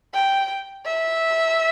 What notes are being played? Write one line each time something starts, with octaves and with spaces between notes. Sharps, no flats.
G5
E5